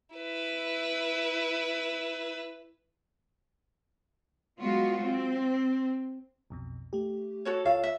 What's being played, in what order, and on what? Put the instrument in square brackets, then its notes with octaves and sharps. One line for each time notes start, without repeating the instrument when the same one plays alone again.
[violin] E4 B4
[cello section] F#3 G#3 B3 F4 F#4
C4
[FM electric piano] B1 F2 B2
A3 G4
[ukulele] F#4 A4 C#5
[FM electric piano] C#2 F4 C#5 [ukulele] A4 F5
[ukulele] E5